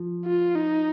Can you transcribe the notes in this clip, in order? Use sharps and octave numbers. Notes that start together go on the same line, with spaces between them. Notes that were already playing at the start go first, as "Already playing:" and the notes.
Already playing: F3
F4
D#4